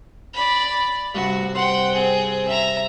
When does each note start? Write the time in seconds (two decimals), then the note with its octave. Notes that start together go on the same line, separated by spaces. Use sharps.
0.34 D5 B5
1.14 G2 C3 F#4
1.55 C5 F#5 G5
1.93 C4 G#4
2.47 E5 A#5